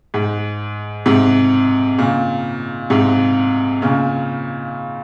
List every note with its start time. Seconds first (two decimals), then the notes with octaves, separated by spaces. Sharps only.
0.14 G#2
1.06 G#2 C3
1.98 A#2 C#3
2.90 G#2 C3
3.82 A#2 C#3